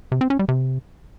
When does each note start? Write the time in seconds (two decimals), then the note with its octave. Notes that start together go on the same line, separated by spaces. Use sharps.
0.12 C3
0.21 C4
0.30 C#4
0.39 G3
0.49 C3